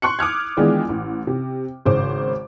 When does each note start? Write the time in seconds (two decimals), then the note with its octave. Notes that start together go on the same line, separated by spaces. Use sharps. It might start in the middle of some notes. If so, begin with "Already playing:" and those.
0.02 C6 C#6 F#6 C#7
0.19 D6 D#6 F6 G#6
0.57 D#3 E3 G#3 B3 D4 F4
0.89 A1
1.27 C3
1.85 G#1 C#3 C5 D6